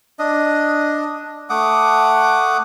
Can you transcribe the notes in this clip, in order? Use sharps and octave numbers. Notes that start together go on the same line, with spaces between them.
D4 D#5
A3 F#5 D6 D#6